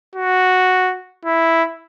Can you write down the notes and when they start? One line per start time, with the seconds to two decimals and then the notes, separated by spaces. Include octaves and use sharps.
0.15 F#4
1.25 E4